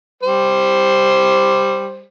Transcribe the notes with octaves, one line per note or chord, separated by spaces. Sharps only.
G3 C5